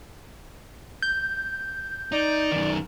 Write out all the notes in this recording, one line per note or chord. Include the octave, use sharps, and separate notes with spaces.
G6
D#4 D5
F#2 D#3